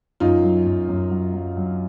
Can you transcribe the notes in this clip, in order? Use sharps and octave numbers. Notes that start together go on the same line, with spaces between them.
F#2 D#4 F4
F#3
F#2
F#2
F#3
F#3
F#3